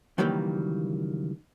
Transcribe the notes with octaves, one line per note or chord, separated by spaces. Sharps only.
C#2 D#3 E3 F#3 G3 A#3